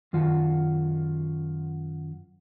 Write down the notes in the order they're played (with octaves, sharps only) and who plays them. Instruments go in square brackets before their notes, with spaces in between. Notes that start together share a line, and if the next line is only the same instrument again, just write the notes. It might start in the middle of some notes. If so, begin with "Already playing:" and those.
[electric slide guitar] F#2 D#3 F4 F#4